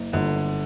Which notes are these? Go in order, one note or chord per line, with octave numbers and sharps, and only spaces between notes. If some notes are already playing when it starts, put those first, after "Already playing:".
Already playing: F#1
G1 D3